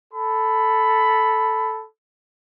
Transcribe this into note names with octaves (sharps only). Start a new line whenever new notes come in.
A4 B5